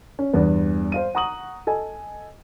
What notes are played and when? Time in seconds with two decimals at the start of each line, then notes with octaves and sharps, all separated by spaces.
0.19 C#4
0.33 E2 G2 B3
0.92 C5 F5 D#7
1.15 F#5 A#5 C#6 D#6 D#7 F#7
1.67 A4 D#5 G#5